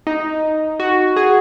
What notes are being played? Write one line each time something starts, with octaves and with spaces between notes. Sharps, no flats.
D#4
F#4
G#4